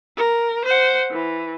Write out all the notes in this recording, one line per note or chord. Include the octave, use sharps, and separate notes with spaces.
A#4
C5 F#5
E3